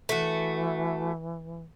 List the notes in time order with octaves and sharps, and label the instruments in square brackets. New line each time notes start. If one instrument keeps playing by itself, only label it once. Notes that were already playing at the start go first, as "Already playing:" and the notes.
[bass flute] E3 [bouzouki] A3 F#4